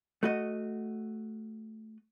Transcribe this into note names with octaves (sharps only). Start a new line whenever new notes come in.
A3 F#4 D#5